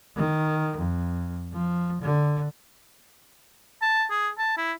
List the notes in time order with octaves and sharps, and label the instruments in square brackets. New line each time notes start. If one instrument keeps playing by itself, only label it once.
[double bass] D#3
F2
F3
D3
[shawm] A5
G#4
A5
E4